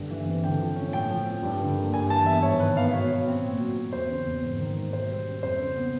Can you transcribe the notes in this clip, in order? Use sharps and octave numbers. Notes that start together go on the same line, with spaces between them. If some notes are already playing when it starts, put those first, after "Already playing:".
Already playing: G2 D3
E3
C4
D3 G5
F3
C#4
A2 G5
F3
C4
G2
D3
A#3
G2 G#5
E3 A5
B3 E5
G#2 C#5
D#3 B4
B3 F5
B2 C#5
F#3
C4
A#2
F#3
C4
E2 C5
C#3
E2
G#2
D#3
G#2
B2 C5
G3
C#4
F2 C5
C#3
B3